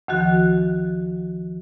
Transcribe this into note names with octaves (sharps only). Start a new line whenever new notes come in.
D2 D#3 F3 F#4 F#6